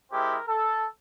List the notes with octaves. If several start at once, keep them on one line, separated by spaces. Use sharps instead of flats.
G#3 C4 E4 G4 A#4
A4